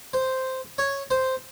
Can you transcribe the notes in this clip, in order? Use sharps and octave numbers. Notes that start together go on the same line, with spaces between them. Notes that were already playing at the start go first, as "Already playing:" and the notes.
C5
C#5
C5